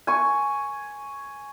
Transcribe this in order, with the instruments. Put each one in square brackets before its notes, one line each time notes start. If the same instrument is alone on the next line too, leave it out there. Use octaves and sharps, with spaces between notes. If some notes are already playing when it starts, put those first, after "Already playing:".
[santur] G#5 C#6